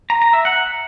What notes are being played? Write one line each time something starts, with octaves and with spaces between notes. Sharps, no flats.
A#5
A#5
E5
F#5